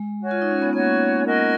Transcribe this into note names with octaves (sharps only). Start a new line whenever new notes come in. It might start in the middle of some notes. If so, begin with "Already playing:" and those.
Already playing: G#3
F#4 C#5 G#5
F4
D#4
C#4
B3
A#3 F#4 C#5 G#5
F#4 A#4 D#5 G#5